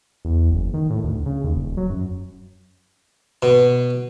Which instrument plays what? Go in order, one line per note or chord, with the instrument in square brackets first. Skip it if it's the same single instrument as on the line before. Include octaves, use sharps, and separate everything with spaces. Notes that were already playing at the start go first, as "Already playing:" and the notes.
[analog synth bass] E2
F#1
D#3
A2
D2
C#3
D#2
D#1
F#3
F#2
[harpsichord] B2